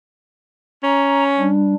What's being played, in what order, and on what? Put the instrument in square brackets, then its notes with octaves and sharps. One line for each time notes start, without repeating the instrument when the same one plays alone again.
[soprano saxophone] C#4 [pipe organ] A#5
[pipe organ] G3 D4